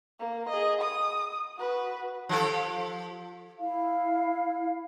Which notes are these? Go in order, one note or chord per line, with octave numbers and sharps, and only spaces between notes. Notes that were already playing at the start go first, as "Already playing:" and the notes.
A#3
G#4 D#5
D#6
F#4 B4
F3 G4 A4
E4 F5